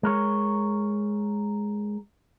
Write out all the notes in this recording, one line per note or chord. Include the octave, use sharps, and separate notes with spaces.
G#3 A#4 C#5